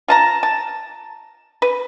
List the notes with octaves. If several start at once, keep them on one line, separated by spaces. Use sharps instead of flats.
F4 A5 A#5
A5
B4